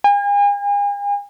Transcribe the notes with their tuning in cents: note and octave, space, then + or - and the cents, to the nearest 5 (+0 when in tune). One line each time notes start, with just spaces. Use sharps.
G#5 -40